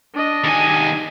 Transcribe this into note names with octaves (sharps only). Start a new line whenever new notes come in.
D4 D#5
D#2 G#5